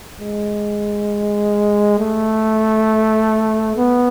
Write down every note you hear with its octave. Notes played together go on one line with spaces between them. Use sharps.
G#3
A3
B3